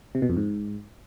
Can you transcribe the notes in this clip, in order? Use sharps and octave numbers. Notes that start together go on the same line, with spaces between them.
C3
B2
F2
G#2